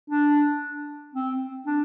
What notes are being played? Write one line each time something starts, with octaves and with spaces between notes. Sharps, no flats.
D4
C4
D4